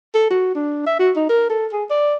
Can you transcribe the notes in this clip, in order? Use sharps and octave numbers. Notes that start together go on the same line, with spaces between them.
A4
F#4
D4
E5
F#4
D#4
A#4
A4
G#4
D5